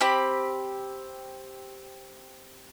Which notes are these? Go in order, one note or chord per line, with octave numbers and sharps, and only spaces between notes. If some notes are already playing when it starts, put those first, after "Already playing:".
C4 G4 B5